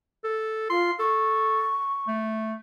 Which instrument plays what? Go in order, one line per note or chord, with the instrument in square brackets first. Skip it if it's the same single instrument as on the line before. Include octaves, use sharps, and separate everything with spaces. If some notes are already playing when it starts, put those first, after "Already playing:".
[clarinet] A4
[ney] F4 [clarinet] C6
[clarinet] A4 [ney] C#6
[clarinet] A3